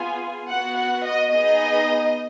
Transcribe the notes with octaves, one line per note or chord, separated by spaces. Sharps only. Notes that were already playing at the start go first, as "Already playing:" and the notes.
Already playing: B3 F4 G#4 G#5
B3 F#4 F#5
F#5
D#5
B3 D#4 G#4 D#5